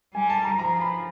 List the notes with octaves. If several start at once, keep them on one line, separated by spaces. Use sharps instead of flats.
G3 G#5
A5
A#5
F3 A#5
B5